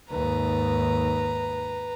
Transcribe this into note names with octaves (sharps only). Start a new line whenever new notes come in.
D#2 G#2 B4 A#5